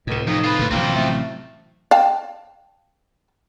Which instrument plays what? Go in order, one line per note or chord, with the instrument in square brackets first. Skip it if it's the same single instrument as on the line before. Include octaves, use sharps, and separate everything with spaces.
[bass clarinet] C#2 [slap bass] A2 C3
[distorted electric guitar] F2 [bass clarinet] D#4
[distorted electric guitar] F4 B4
[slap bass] A2 D3
[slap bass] A1 C3 F#3 [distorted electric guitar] F3 C4 [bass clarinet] A#3
[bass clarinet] A3
[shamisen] F5 G5 A5